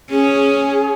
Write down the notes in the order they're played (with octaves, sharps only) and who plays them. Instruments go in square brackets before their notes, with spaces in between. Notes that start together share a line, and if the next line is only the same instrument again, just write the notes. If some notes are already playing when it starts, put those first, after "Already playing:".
[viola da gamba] C#4 [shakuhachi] G#4